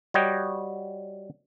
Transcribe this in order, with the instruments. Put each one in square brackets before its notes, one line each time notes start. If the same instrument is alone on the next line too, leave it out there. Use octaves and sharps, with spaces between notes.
[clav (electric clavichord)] G3 F#4 C#5 D#5 G5